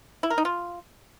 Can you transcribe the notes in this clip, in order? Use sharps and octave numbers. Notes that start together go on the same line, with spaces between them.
E4
A#4
D#4
F4